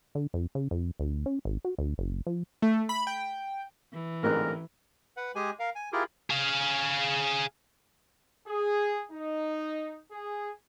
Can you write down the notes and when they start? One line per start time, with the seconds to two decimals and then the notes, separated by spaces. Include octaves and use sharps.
0.15 D3
0.34 F2
0.55 C#3
0.71 F2
1.00 D2
1.26 C#4
1.45 G#1
1.65 F#4
1.78 D2
1.98 F#1
2.27 F3
2.62 A3
2.89 B5
3.07 G5
3.93 E3
4.23 A1 G#2 D3 A#3 C4 A#4 F#6
5.17 B4 F#5
5.35 G#3 G4 G#4 G#5
5.59 A#4 F5
5.75 G#5
5.93 E4 F4 G4 G#4 A#4
6.30 G#4 F5
8.47 G#4
9.11 D#4
10.11 G#4